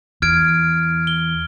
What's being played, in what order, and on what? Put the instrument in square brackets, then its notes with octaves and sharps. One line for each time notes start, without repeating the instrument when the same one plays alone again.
[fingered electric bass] E2 [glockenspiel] F6 G#6 D7
[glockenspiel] G7